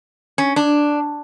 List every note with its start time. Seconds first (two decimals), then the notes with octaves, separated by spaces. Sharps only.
0.38 C#4
0.56 D4